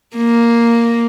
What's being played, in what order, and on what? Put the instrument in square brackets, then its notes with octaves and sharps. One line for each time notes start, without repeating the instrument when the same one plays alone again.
[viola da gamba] A#3